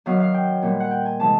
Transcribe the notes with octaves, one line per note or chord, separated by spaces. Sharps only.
F#2 D#3 F#3 B3 F5
F5
G5
A#2 G3 B3
F#5
G5
G#5
C3 E3 G#3 B3 A5